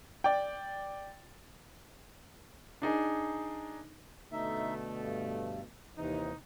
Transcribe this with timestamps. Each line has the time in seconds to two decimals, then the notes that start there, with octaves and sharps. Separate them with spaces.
0.24 D5 G5
2.82 D4 D#4 G#4
4.32 B2 D3 A3 D#4 E5
4.99 G2
5.97 D#2 C3 E3 D#4